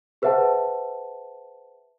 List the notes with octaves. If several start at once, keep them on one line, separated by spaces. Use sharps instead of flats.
G#4 B4 C5 E5 F#5 A5